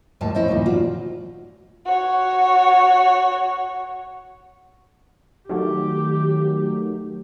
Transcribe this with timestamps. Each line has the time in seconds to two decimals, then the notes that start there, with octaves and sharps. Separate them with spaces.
0.21 D#2 A2 G3 A5
0.35 E4 C5 C#5 D#5
0.48 D#2 A#2 G3 D#4
0.66 F4 F#4 D5
1.85 F#4 C#5
5.49 D#3 F#3 A3 G4